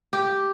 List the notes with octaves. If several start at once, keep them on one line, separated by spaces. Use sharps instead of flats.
G4